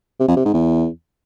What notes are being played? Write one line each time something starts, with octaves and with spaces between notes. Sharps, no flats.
C3
F2
C3
G#2
E2